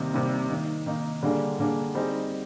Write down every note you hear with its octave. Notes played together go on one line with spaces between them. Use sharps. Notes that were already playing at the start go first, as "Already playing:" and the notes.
Already playing: C3 D#3 G3 A#3
C3 D#3 G3 A#3
D#3 A#3 D#4
D#3 A#3 D#4
D3 G3 A#3 D4 G#4
D3 G3 A#3 D4 G#4
G3 C4 D#4 G#4